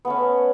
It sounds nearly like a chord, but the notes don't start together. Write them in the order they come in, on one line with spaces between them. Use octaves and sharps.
B3 A3 C#4